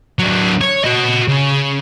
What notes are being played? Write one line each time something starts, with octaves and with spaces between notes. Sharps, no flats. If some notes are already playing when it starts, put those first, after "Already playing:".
F#3 D4
C#5
F#4 D#5
C#3